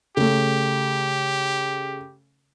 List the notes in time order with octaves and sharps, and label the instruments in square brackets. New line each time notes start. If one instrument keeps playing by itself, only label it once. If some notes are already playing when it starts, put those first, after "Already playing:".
[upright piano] C#3 A3 [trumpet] G4